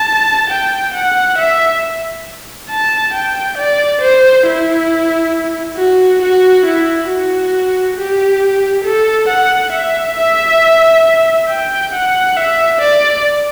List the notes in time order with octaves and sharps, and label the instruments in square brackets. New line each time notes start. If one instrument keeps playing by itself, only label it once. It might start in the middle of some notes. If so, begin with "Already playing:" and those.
Already playing: [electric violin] A5
G5
F#5
E5
A5
G5
D5
C5
E4
F#4
F#4
E4
F#4
G4
A4
F#5
E5
E5
G5
F#5
E5
D5